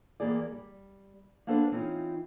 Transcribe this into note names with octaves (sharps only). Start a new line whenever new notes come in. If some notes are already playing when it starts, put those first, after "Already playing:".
E2 E3 A#3 G4 G#4 D5
G3
A#3 B3 D4 A4 B4 C5
E3 C4 C#4 D#4 F4